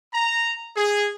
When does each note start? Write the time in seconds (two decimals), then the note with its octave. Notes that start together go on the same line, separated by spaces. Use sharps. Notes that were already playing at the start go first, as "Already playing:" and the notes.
0.13 A#5
0.77 G#4